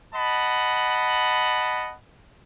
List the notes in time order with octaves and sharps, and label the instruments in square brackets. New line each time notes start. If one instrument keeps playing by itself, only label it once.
[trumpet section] D#5 F#5 A5 B5